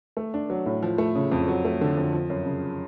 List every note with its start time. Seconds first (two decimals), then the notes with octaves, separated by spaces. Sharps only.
0.17 A3
0.34 D4
0.50 F#3
0.66 A2
0.83 F3
0.98 A3
1.15 C#3
1.32 F2
1.48 F#3
1.65 A3
1.81 D3
1.97 F2
2.13 F3
2.30 F#2
2.46 C#3